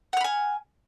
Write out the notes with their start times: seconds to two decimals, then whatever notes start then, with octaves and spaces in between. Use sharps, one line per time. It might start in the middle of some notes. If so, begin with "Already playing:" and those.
0.13 F#5
0.17 F6
0.21 B5
0.24 G#5